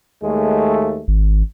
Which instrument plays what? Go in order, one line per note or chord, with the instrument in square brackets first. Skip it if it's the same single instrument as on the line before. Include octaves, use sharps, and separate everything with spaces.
[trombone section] D#2 G#3 A3
[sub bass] G#1